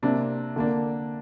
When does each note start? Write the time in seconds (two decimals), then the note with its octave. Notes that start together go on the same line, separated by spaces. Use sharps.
0.02 C3 A#3 D4
0.56 D3 A#3 D4